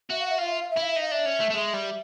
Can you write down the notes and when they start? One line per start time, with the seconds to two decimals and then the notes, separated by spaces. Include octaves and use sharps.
0.10 F#4 E5
0.19 F5
0.29 E5
0.39 F4 F5
0.50 E5
0.60 F5
0.70 E5
0.77 E4 F5
0.91 E5
0.96 D#4 F5
1.11 D4 E5
1.26 C#4
1.40 A3
1.50 A3
1.54 G#3 E5
1.73 G3